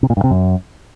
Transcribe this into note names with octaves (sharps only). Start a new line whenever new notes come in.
C3
A#2
G2
C3
F#2